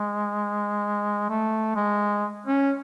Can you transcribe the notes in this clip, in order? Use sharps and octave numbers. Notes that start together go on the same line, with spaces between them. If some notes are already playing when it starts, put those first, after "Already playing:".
Already playing: G#3
A3
G#3
C#4